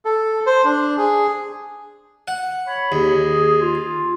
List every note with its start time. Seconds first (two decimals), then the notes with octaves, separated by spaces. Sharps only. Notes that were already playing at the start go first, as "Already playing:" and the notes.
0.05 A4
0.47 C5
0.65 D4
0.98 G#4
2.28 F#5
2.66 C#5 B5
2.92 D#2 G#4
3.61 F4